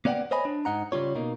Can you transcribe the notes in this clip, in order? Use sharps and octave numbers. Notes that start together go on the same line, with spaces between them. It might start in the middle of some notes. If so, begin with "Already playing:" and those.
A#3 B3 D5 D#5 F#5 G5
C5 C#5 D#5 G#5 B5
D4
G#2 D#4 F#5 A#5
C#3 G3 F4 C#5
B2 A#3 D#4